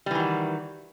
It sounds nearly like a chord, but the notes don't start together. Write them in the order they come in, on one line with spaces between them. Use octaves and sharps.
G3 E3 D#3 F#4